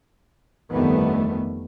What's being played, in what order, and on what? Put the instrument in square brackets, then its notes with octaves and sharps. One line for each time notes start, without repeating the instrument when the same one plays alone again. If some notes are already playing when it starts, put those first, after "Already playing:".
[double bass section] G1 F2 D#3 G3 A3 B3